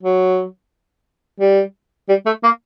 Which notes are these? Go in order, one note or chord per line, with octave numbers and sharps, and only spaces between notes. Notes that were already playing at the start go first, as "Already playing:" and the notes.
F#3
G3
G3
A3
A#3